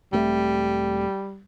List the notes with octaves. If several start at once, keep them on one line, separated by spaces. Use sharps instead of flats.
E1 G3 A3 C4